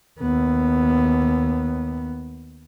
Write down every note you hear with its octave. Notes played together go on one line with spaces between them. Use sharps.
D#2 B3